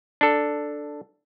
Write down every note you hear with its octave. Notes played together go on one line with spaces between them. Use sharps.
D4 A4